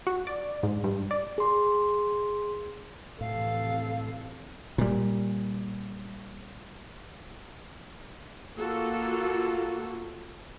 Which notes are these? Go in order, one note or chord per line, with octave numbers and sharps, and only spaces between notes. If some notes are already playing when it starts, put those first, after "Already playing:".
F#4
D5
G#2
G2
D5
G#4 C6
F1 A2 C3 E3 A4 F5
A#2 G3
A#3 F4 F#4 A4